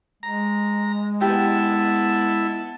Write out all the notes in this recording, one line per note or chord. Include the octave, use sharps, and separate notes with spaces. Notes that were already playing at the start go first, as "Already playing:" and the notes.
G#3 A#5
B3 E4 G4 A5